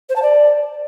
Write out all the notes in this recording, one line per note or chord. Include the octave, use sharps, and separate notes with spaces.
C5
A5
D5